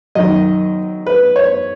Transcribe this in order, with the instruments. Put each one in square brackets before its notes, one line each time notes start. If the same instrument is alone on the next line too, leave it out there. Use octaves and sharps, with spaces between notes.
[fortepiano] F#2 D#3 D#5
B4
C#5